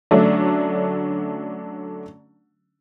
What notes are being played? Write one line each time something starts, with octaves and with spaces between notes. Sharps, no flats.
D3 F#3 A3 C#4 D4